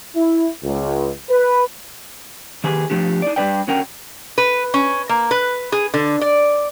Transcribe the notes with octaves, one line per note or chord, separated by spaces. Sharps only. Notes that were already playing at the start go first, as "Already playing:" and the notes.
E4
C#2
B4
D#3 G4 G#4 B4
F3 A3 D4 G4
D#4 D5
G3 A#3 D4 B4 D5 G5
D3 C#4 F#4 A#4 G5
B4
C#4
A#3
B4
G#4
D3
D5